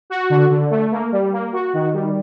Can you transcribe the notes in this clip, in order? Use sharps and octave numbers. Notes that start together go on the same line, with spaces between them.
F#4
D3
D3
A3
A#3
G3
A#3
F#4
D#3
G3